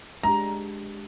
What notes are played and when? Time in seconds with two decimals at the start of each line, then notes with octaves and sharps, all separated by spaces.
0.23 G#3 D4 G4 A#5